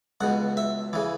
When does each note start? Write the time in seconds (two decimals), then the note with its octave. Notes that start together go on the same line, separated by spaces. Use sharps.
0.21 C#2 B2 F#5
0.57 E5
0.93 C#3 E3